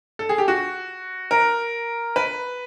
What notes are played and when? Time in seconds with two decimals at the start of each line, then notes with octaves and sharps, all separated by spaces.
0.19 A4
0.29 G#4
0.38 G4
0.48 F#4
1.31 A#4
2.16 B4